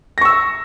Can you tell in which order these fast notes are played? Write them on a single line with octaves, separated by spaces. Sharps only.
A#6 C#6 E6